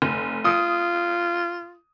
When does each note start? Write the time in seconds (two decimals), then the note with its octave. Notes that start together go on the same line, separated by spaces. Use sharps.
0.02 F1
0.45 F4 D#6